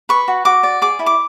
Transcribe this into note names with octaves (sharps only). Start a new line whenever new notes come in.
B4 C#6
F#4
F#4 D6
D5
G#4 D6
E4
D6